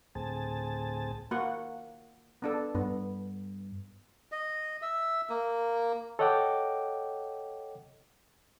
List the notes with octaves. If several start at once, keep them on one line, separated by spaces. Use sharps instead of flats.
D2 A2 C4 G#4 A5
A#3 F#4 F#5
B3 D4 A4
G2 B3
D#5
E5
A#3
A4 C#5 D#5 F#5 G5 D6